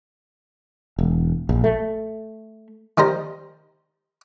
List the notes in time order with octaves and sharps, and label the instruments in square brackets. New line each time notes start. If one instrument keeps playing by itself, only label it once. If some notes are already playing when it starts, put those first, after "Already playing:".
[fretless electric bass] E1
A#1
A3
[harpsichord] D#3 G3 C5 A#5